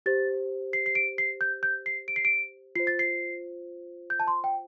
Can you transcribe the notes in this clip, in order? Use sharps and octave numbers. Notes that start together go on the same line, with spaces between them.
G4 C5 A6
C7
C7
D7
C7
G6
G6
C7
D7
C7
D7
F4 C5 C7
A6
C7
G6
A5
C6
G5